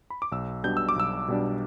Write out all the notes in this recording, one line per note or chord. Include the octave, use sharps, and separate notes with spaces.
B5
D6
B1 E6
B2 G3 D4 G6
E6
D6
B1 E6
B2 G3 D4